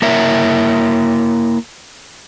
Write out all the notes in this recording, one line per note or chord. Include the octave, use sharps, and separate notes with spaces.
A#3 E4 A#4 C#5 E5